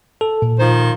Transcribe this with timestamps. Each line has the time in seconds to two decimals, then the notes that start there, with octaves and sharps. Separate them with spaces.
0.21 A4
0.42 A#2
0.59 D#3 F3 C5